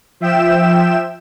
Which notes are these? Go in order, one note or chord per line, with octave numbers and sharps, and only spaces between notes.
F3 E5 G5 E7